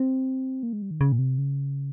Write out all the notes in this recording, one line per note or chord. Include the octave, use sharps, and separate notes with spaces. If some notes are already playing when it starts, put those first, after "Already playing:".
Already playing: C4
A#3
G#3
G3
D#3
C#3
A#2
C3
C#3